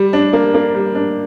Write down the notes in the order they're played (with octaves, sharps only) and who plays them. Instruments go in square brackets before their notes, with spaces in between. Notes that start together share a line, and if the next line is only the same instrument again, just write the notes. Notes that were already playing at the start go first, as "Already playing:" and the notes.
Already playing: [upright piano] G3
D4
A#3
A#3
G3
D4